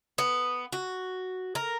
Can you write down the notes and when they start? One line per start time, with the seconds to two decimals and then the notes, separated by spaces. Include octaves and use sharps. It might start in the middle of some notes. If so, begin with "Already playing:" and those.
0.18 B3
0.73 F#4
1.55 A#4